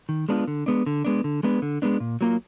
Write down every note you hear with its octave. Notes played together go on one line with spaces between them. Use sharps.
D#3
G#3 B3 D4 F4
D3
G#3 B3 D4
D3
G#3 B3 D4
D3
G#3 B3 D4
D3
G#3 B3 D4
A#2
F#3 A#3 F4